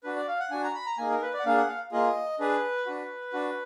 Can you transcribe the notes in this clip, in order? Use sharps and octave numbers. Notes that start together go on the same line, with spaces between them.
D4 F#4 B4
D5
F5
F#5
D4 F#4 G#5
A#5
B5
A#5
A#3 D#4 G#4 G#5
A#4
B4
D5
F#5
A#3 D4 G#4 F5
F#5
F5
A#3 F4 G#4 D#5
D4 G#4 B4
D4 F#4
D4 F#4